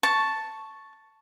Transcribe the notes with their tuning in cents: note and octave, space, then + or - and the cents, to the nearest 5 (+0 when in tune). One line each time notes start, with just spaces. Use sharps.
A5 +0 C#6 +0